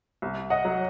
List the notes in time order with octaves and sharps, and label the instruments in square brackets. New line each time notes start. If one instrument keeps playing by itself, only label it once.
[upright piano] C2
D#5 F#5
F#3